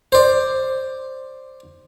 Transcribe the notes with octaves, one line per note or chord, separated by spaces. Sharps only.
C5 D5